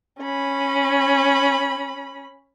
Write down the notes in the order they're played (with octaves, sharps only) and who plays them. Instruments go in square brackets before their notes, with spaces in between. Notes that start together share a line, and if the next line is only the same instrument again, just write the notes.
[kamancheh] C#4 B5